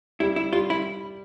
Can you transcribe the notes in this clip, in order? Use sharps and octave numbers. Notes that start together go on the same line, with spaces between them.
G3 E4
E4
G3 F4
E4